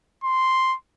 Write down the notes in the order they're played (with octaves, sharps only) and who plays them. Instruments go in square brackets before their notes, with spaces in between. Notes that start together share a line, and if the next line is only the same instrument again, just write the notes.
[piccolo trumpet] C6